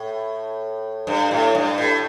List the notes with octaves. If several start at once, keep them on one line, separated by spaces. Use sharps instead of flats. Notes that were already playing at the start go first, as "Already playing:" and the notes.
Already playing: A2
G2
A2
G2
A2